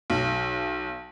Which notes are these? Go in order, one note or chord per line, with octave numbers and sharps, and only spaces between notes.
B1